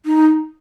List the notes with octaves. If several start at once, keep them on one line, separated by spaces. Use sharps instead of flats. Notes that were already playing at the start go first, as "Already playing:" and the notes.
D#4